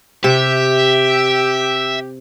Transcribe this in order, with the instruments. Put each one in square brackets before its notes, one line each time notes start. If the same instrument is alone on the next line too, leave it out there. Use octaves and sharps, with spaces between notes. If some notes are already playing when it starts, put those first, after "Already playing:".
[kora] C3 [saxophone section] G4 [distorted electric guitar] E5